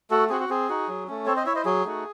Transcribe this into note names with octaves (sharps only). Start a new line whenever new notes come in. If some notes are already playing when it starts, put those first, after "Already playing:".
A3 F#4 A4
C4 F#4 G#4
F#4
C4 G#4
D#4 F#4
F#3
A3 C#4
C4 A4 C#5
C5 D#5
E4 C#5 E5
C5 D#5
F#3 G#4
A3 D#4 F#4